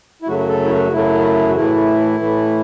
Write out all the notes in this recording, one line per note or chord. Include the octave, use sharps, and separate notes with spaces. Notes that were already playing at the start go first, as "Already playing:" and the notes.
E4
F#2 C#3 F#3 A3 F#4
F#4
A4
E4
F#4
F#2 C#3 F#3 A3 E4
F#4
A2 E3 A3 E4
A2 E3 A3